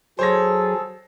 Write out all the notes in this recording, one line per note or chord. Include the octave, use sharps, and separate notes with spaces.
F#3 G#4 A4 C5 C#5 A#6